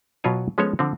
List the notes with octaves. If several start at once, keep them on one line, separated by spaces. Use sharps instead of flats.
B2 F#3 B3 F4 C#5 G#5
F3 G#3 B3 C#4 A4 C#5
D3 F3 C4